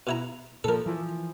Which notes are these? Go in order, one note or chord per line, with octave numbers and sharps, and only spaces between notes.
B2 E4 A#5
A#2 F3 A4 A#4
E3 F3